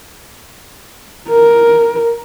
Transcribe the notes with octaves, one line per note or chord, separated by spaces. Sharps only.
A#4